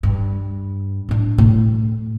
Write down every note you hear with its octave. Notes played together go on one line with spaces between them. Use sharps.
G2
A2 D4
A2